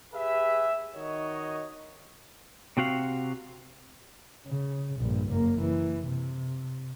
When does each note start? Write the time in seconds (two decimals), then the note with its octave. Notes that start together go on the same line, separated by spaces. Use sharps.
0.14 G4 G#4 B4 E5
0.95 D#3 F#4 C#5 D#5
2.77 C3 C4 F#4 F5
4.47 C#3
4.98 A#1 G2
5.30 F#1 A#3
5.61 E3
6.08 C3